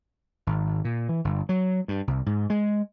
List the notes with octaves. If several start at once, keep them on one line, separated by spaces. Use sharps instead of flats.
G#1
A#2
E3
G1
F#3
G2
C2
G#2
G#3